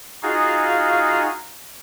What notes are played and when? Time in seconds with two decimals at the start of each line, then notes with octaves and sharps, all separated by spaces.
0.23 D#4 F4 F#4 G#4 F5